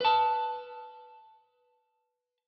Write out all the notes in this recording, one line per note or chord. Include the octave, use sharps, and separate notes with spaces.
B4 A5